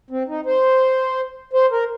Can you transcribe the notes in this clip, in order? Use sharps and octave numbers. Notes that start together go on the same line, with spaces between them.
C4
D#4
C5
C5
A#4